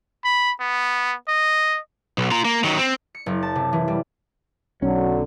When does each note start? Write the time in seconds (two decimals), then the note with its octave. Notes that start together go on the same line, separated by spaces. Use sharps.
0.25 B5
0.61 B3
1.28 D#5
2.18 B1
2.31 F4 A#5
2.45 A#3
2.64 D#3 F#3
2.78 C4
3.15 C#7
3.26 F#1
3.43 A5
3.55 C3
3.73 E3
3.88 G3
4.82 B1 D3 F#3 C#4